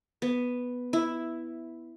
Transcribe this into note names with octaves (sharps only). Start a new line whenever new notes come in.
B3
E4